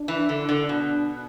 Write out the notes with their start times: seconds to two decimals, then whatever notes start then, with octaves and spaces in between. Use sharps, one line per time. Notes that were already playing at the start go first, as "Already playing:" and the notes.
Already playing: D4
0.08 E3
0.29 D3
0.49 D3
0.69 B2